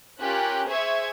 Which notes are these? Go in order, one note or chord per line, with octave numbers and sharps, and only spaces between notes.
C#4 F4 G4 A#4 F#6
G#4 C5 E5 C#6 G#6